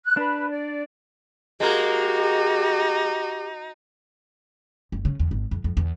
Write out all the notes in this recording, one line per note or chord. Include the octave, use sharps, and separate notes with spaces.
F#6
D4 B4
D5
G#3 A#3 D#4 F#4 G4 A#4
F#1
C#3
E2
G#1
F2
F2
E2